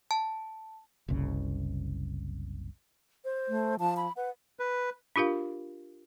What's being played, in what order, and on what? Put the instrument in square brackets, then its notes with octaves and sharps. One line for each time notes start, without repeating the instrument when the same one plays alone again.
[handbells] A5
[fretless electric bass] F#1 C2 C#3
[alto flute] C5
[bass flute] A3
[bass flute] F3 [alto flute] A5
[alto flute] B5
[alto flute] B4 [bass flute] F#5
[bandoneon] B4
[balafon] D4 F4 G4 A#4 F5